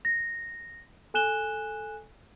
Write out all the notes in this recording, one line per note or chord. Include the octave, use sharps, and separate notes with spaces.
A#6
A4 G#5 F#6 E7 G7